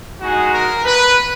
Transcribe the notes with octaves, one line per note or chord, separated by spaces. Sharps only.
G#3 D#4 F#4 G#4
A#4
B4